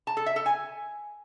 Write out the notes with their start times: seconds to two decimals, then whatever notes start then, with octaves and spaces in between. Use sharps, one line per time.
0.07 A5
0.17 A4
0.26 E5
0.36 A4
0.46 G#5